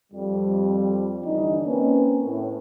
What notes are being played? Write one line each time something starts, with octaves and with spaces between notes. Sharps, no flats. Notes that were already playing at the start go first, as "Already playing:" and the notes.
F2 G3
G1 E3 D4 D#4 D#5
A#3 C4 C#4 A#4 B4
A2